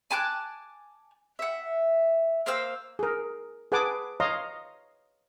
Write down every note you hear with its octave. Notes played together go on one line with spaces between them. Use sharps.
G#5 A5 D6 F#6
E5 F#5
A#3 C5 F5 E6
G#4 A#4
G#4 B4 F#5 G#5 A5 D6
C#5 D#5 F5 A#5 C6